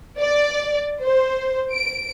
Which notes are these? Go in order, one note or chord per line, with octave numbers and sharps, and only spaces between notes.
D5
C5
D7